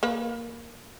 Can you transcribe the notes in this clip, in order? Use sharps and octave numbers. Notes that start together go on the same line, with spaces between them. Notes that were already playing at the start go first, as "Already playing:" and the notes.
A#3 B4